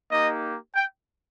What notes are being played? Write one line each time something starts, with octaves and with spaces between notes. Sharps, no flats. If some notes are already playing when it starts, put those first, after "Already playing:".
A#3 D#4 G4 D#5
G5